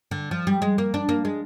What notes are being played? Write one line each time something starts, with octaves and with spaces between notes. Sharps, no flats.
D3
F3
G3
G#3
A#3
D4
A#3
G#3